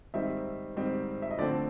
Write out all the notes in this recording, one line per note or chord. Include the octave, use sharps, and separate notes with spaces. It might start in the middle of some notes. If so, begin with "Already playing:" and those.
G#2 D#3 G3 C4 D#4 E5
G#2 D#3 G3 C4 D#4
E5
D#5
D3 F3 A3 C4 D5